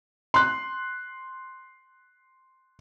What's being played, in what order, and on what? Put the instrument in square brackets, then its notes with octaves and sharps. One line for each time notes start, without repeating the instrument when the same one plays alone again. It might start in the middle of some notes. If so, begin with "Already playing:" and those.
[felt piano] C6 F#6